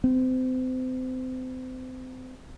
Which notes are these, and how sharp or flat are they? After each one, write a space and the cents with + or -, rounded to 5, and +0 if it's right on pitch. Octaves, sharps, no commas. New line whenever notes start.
C4 -35